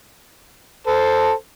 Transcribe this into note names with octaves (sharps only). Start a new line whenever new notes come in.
A4 C5